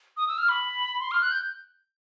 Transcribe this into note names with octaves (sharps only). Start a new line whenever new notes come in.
D#6
E6
F6
B5
C6
F6
F#6
G6